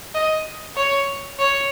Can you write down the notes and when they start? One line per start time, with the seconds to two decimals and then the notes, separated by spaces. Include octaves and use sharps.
0.14 D#5
0.76 C#5
1.39 C#5